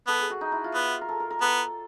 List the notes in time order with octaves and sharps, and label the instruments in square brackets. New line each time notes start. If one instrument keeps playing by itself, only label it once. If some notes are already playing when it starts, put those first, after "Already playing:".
[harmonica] B3 [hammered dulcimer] A4
[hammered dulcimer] G#4
F#4
D#4
E4
F4
[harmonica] B3
[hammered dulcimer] A#4
A4
A#4
A#4
[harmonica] B3 [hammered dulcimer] A4